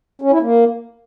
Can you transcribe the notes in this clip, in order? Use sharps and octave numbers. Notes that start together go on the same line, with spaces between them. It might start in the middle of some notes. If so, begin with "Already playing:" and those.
C#4
E4
A#3